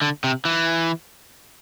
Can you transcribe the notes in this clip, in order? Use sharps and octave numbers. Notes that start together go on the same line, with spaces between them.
D3
C3
E3